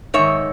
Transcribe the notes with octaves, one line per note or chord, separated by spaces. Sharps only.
G#2 D#3 C#5 E5